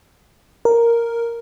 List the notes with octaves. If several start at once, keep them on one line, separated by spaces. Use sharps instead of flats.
A#4